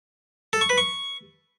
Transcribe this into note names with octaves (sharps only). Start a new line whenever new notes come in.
A4
C#6
B4
C#6